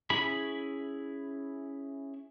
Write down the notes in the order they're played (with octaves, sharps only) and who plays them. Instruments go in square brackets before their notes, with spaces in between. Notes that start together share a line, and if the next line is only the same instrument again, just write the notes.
[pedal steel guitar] C#4 E4 G#4 B5